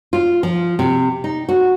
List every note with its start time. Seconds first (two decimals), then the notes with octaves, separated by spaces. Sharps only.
0.13 F4
0.43 F3
0.79 C3
1.24 D#4
1.49 F#4